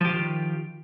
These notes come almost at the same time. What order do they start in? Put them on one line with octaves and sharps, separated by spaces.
F3 G4 F4 D#3